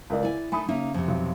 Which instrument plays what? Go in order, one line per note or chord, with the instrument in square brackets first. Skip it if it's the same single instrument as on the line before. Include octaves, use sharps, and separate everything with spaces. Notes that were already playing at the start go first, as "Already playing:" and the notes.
[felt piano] C#2 A#4 D5
[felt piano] E4 [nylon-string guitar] D5 G#5
[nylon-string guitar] A3 D#4 [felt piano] G#5 B5 D#6
[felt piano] C#3 [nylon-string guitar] A#3 D#4 E5
[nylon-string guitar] F2 C3
[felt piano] B1